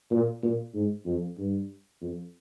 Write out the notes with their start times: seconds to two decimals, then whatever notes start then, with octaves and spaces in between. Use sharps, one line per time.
0.11 A#2
0.43 A#2
0.74 G#2
1.06 F2
1.38 G2
2.01 F2